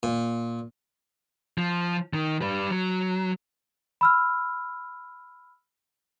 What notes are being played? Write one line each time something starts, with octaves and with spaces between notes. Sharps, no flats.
A#2
F3
D#3
G3 B4
F#3
B5 E6 F6